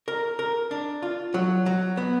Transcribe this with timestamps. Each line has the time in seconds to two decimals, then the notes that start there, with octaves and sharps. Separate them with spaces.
0.08 A#4
0.39 A#4
0.71 D4
1.02 F4
1.34 F#3
1.66 F#3
1.97 B3